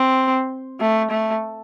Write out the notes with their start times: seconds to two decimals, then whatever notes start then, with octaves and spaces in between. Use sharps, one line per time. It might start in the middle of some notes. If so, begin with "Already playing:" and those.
Already playing: C4
0.80 A3
1.11 A3